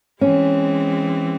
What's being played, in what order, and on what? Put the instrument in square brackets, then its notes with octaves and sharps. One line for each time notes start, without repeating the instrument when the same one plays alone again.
[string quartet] E3 G#3 C4 [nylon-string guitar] C#4